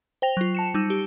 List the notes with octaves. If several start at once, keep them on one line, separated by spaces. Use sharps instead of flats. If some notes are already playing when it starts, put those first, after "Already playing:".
C5 G5 A#6 F7
F#3 F4
A5 C#7 E7
G3 D#4 E6
G4